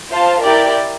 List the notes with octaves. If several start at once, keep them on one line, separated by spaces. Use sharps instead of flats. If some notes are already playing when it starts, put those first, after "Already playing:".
F4 C5 F5 A5
E4 G4 A#4 D5 G5